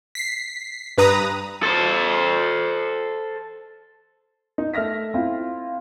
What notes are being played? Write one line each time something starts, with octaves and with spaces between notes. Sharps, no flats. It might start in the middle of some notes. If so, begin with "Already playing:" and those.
B6 C7
G2 B4 A#5 D#6
A4 C5
D#4
A3 E5 F6 A#6 B6
C4 E4 F4